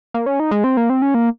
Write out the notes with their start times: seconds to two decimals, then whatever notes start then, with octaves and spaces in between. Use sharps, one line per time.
0.14 A#3
0.26 C#4
0.40 D#4
0.51 G#3
0.64 C4
0.77 A#3
0.90 C4
1.02 C#4
1.14 A#3